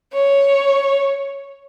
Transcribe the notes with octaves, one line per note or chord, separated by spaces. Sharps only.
C#5